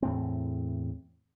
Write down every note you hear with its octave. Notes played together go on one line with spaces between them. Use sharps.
E2 A2 C4